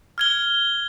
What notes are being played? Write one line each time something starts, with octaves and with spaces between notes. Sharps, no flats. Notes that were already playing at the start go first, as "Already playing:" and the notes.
F6 G#6 G7